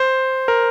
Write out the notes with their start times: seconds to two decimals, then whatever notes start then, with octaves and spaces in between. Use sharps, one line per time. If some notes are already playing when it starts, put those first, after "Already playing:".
Already playing: C5
0.48 A#4